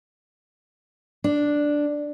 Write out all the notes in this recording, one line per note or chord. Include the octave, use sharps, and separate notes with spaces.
D4